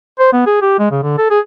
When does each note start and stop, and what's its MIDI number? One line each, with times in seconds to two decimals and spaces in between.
0.19 0.29 72
0.33 0.43 59
0.47 0.58 68
0.62 0.79 67
0.79 0.88 56
0.91 0.99 49
1.03 1.13 50
1.18 1.29 69
1.30 1.39 68